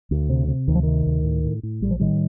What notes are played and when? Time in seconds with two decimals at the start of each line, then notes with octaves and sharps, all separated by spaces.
0.11 D2
0.29 C3
0.48 C3
0.67 D2 D#3
0.75 F3
0.83 C3 D#3
1.06 D2
1.24 A2
1.44 A2
1.63 A2
1.81 A#1 G3
1.91 F3
2.00 A2 D#3 G3